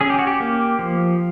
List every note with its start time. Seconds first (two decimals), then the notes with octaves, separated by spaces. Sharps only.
0.01 C#4 G#4
0.10 G4
0.19 F#4
0.27 G4
0.40 A#3
0.79 F3